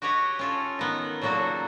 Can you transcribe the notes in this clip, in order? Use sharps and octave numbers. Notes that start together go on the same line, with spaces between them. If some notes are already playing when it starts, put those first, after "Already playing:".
F#4 G4 B4 C#5 D#5
C#4 F4 A4
D#3 B3 D#4
A#2 C#3 F#3 A#3 F#4 A4